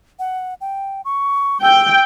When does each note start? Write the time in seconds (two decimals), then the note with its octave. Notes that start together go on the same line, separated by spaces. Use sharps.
0.19 F#5
0.61 G5
1.05 C#6
1.63 G5 E6